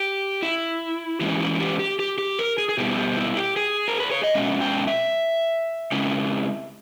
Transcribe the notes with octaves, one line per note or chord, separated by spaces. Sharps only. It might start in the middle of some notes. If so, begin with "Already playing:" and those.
Already playing: G4
E4
E3 G#3 C#4 E4 G4
E4
G4
G4
G4
G4
A#4
G#4
G#4
B2 G3 B3 E4 G4
E4
G4
E4
G4
G#4
A#4
B4
C#5
D#5
B2 G#3 C#4 E5
G5
E5
C#3 G#3 C#4 E4